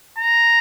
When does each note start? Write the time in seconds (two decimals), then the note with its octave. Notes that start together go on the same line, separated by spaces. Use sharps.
0.18 A#5